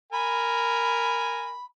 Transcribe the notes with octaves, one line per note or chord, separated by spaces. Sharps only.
A#4 G#5 B5